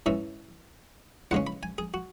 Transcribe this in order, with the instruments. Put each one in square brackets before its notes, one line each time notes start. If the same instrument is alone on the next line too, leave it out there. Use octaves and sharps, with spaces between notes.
[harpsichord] G#2 E3 C#4 E5
E2 C#3 G#3 C#4 F#5
B5
G#5
G#4
F#4